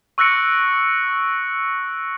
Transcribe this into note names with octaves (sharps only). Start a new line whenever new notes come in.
C#6 E6 F#6 A#6 C#7 D7